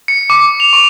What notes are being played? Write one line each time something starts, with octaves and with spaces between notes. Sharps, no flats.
C#7
D6
F7
C#6